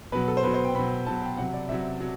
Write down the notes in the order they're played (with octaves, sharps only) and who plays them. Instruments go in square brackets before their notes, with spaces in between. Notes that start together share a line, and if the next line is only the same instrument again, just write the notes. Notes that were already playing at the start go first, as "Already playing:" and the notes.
[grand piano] B2 F#3 B4
A4
C5
B2 F#3 B4
C5
G5
B2 F#3 B5
B2 F#3 A5
G5
C3 F#3 F#5
D5
C3 F#3 E5
F#3